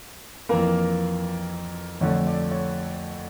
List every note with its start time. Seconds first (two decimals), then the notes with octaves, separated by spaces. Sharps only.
0.49 F2 E3 A#3 A#4
2.01 F2 D3 A3 C#5
2.27 D5
2.51 C#5